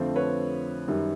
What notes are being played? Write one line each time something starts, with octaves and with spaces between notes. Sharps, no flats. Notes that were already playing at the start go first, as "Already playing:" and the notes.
Already playing: F2 D3 F3 A3 C4
B4 C#5
F#2 D#3 G3